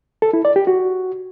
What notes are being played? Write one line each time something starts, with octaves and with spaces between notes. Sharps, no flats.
A4
E4
D5
G4
F#4